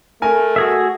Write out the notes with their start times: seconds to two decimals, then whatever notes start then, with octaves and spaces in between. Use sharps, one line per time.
0.22 A3 A#4 G#5
0.56 F#4 G#4 E5